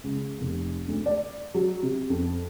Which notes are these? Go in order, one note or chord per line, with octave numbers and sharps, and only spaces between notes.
C#2
F1
D2
D5
F#3
C3
F2